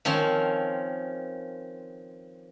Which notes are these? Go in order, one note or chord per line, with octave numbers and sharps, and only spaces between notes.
D#3 F3 C4 C#4